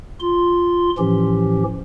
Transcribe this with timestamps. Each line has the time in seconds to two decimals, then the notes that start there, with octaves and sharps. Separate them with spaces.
0.20 F4 C6
0.98 A2 E3 F3 C#4 G4